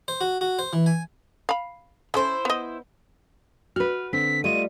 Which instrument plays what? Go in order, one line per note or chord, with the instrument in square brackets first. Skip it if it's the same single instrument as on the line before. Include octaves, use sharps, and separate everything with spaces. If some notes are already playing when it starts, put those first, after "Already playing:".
[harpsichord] C5
F#4
F#4
C5
E3
G#5
[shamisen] F5 B5
[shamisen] C#4 A4 [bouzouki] E4 C5
[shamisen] B3 D#5
[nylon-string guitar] F#4 B4 [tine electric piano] F6
[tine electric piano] D3 [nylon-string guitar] C4 [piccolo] B6
[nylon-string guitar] G3 [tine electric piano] A3 F4 D#5 [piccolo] D#7